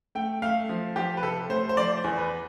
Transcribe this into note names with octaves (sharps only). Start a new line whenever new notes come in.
A3 G5
A3 F5
F3
F3 G4
B4
C3 A4
A3 C5
C5
F3 D5
C5
E2
B4